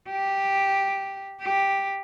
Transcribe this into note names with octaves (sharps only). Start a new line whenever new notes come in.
G4
G4